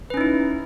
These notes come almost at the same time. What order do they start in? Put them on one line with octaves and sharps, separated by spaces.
B4 C#4 D#4 E4